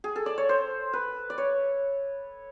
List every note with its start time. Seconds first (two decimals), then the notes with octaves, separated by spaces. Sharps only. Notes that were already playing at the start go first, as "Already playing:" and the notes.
0.04 G#4
0.16 A4
0.26 D5
0.38 C#5
0.49 C5
0.93 B4
1.30 D5
1.38 C#5